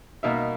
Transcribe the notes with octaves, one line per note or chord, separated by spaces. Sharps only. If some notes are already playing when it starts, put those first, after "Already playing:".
B2 A#3 D#4 A#4 E5